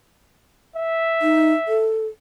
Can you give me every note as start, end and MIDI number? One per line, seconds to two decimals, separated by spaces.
0.76 1.89 76
1.22 1.53 63
1.68 2.06 69